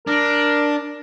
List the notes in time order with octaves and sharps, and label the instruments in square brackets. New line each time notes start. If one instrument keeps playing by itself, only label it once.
[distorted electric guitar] D4 [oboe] A#4